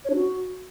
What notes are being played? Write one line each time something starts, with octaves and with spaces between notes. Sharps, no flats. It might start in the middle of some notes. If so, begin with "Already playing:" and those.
C#5
D4
F#4